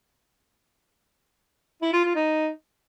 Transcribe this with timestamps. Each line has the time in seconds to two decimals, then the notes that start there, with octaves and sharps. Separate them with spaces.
1.82 E4
1.93 F4
2.04 F4
2.15 D#4